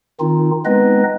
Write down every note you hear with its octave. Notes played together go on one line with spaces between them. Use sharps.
D#3 C4 D#4 F4
G#3 B3 C4 D#4 B4 D#5